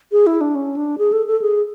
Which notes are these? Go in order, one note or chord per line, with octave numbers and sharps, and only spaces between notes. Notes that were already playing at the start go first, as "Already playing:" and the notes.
G#4
E4
D4
C#4
D4
G#4
A4
A4
G#4